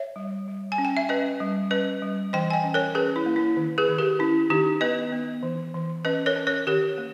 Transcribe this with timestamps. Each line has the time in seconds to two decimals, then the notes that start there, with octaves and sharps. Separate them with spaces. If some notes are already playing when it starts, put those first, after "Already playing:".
Already playing: C#5 E5
0.16 G3
0.48 G3
0.72 G#5
0.78 C#4
0.85 G5
0.97 E5
1.09 C#4 B4 D#5
1.40 G3
1.71 C#4 B4 D#5
2.02 G3
2.33 E3 D#5 G5
2.50 G#5
2.53 D#5 G5
2.64 C#4
2.74 A#4 C#5
2.95 C#4 G#4 B4
3.16 E4
3.26 A#3
3.36 E4
3.57 D#3
3.78 G#4 B4
3.89 D#3
3.98 G4 A#4
4.19 C#4 E4
4.50 D#3 D#4 G4
4.81 B3 B4 D#5
5.12 B3
5.43 E3
5.74 E3
6.05 C#4 B4 D#5
6.26 A#4 C#5
6.36 C#4
6.47 A#4 C#5
6.67 D#3 G4 A#4
6.98 A#3